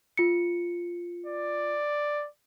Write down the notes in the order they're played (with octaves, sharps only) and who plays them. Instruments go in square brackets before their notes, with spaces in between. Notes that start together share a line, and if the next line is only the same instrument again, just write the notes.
[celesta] F4 C#7
[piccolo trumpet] D5